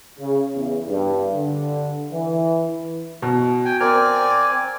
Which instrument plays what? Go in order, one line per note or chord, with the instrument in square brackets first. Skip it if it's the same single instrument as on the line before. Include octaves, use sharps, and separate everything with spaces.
[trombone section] C#3
E2
G2
D3
E3
[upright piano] B2
[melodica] G5 G#5
[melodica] C4 D5 G#5 [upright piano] A#4 A#5